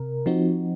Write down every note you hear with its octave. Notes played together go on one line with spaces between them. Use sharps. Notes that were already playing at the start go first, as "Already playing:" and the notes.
Already playing: C3 A#4
F3 C4 D#4 F#4